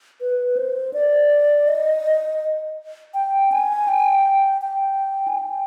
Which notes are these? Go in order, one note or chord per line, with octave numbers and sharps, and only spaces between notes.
B4
C5
D5
D#5
G5
G#5
G5
G5
G#5
G5